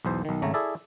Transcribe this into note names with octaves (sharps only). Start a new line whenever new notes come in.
B1 E2 C5
B1 D#3
G#1 C#3 A3 A#5
E4 G#4 A4 D5 E5